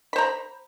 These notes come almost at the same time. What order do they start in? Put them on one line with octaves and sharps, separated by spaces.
B5 C5 A#5